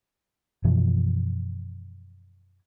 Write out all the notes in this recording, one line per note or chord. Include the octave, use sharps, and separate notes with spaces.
F#2 B2 E3 F3